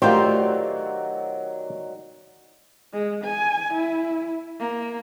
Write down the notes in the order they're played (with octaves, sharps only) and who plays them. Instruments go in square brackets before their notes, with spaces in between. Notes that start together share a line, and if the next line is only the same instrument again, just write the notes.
[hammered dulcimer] D#3 F#3 D5 [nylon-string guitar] A3 F4 G4 [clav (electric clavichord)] C5
[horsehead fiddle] G#3
G#5
E4
A#3